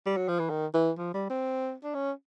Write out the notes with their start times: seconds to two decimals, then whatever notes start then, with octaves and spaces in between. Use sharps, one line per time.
0.06 G3
0.17 F#3
0.28 F3
0.39 E3
0.50 D#3
0.74 E3
0.98 F3
1.14 G3
1.30 C4
1.83 D4
1.94 C#4